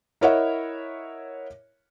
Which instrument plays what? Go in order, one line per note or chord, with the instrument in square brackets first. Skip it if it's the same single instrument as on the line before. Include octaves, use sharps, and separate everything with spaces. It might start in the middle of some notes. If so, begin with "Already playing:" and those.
[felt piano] E4 A#4 C#5 D#5 E5 F#5